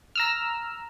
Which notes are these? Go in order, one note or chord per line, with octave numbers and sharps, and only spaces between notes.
A#5 E6 F6